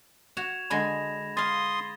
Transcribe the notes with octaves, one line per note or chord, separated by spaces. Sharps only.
F#4 G#6 E7 F7
D3 G#3 G#5 B5 A#6
F5 G#5 C6 D#6 A6